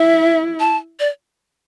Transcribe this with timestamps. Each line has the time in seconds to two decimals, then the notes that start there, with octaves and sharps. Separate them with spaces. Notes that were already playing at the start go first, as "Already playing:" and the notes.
Already playing: E4 E5
0.60 A5
1.00 D5